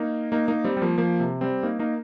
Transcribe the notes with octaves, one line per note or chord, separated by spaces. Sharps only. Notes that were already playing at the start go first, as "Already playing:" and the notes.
Already playing: A#3 D#4
A#3 D#4
A#3 D#4
G3 C4
G3
F3 A#3
F3 A#3
C3
G3 C4
A#3 D#4
A#3 D#4